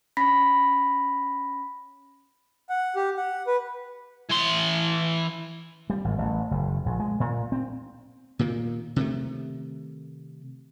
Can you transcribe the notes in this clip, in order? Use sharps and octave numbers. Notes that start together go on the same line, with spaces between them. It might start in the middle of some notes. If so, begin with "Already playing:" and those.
C#4 B5 A#6 B6
F#5
G4
F#5
B4
E3 C6
G3
G#1
A1
F#1
A#1
G#3
A#2
C4
A#2 D#3 A#3
C3 D#3 A3